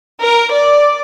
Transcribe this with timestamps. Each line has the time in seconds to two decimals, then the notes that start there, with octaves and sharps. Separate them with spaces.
0.21 A#4
0.52 D5